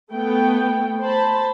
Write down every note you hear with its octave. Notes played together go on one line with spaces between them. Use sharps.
A3 B3 G5
C5 A5 B5